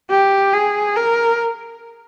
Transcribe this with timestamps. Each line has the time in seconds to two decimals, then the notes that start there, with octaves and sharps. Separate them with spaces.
0.10 G4
0.53 G#4
0.96 A#4